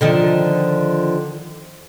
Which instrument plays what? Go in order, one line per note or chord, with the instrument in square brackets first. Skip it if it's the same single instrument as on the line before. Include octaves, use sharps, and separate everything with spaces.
[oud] D3 D#3 F3